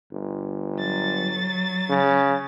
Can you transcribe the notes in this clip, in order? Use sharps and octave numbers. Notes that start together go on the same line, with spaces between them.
G1
F#3 A6
C#3